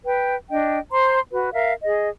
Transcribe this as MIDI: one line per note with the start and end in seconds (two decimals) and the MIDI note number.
0.05 0.35 71
0.05 0.35 79
0.50 0.79 62
0.50 0.79 75
0.50 0.79 79
0.91 1.19 72
0.91 1.19 82
0.91 1.19 84
1.31 1.50 66
1.31 1.50 71
1.53 1.73 70
1.53 1.73 76
1.53 1.73 77
1.84 2.09 68
1.84 2.09 75